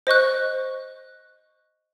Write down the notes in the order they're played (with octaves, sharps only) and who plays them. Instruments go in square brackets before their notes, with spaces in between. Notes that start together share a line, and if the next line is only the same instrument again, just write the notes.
[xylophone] C5 D#5 C#6 F#6